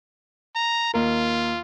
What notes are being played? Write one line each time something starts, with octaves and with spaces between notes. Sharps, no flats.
A#5
D#2 F4 A#4